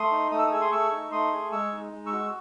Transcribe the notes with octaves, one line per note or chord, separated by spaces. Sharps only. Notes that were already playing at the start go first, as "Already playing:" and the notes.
Already playing: A3 C6 D#6
D#4
A3 D#6
E6
D#6
G#4 E6
C6 D#6
A3 C#6 E6
D#4
A3 C6 D#6
G#4
G#3 C#6 E6
D#4
G#3
C#6 E6
F#4